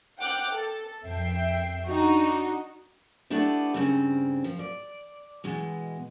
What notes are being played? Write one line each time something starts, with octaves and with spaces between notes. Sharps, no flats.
F#5 G5 D6 F6 F#6
A4
F2 E5 G5 C7
D4 D#4 F#4
A3 B3 D4 E4 G4
G2 C#3 C4
F3
D5
B2 E3 G#3